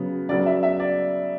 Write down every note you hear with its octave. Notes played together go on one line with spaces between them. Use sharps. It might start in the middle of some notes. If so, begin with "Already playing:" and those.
Already playing: C#3 F#3 B3
C#3 F#3 B3 D5
E5
E5
D5